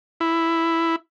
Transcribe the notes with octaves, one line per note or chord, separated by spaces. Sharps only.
E4